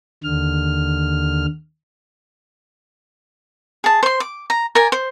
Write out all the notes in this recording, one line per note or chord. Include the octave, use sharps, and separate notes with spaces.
D#2 D3 F6
G#4 A5
C5 C6
D6
A#5
A#4 D5 G#5
C5